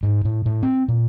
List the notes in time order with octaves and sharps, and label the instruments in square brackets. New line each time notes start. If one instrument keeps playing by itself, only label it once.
[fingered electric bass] G#2
A2
A2
C4
A#2